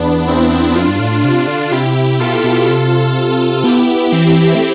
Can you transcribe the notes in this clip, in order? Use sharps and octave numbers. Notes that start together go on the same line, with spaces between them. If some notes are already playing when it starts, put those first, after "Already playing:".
Already playing: E2 B3 D4
C4 E4
F2 D4 F4
G2
A2
C3 D4 F4
D3
C3 E4 G4
B2 F4 A4
B2
C3
B3 E4 G4
E3 C4 E4
A3